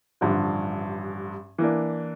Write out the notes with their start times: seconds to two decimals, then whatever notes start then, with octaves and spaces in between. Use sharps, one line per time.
0.21 A1 G2 D3 F3
1.58 E3 A#3 D4